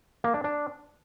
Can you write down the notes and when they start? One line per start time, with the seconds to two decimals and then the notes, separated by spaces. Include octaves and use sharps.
0.24 A#3
0.34 D4
0.44 D4